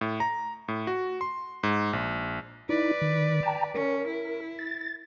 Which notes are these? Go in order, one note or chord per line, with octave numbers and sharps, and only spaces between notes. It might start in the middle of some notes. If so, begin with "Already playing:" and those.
A2
A#5
A2
F#4
C6
G#2
A#1
D#4 E4 B4 D5
D#3
G5 A5 A#5
C#4 A#4
E4
A6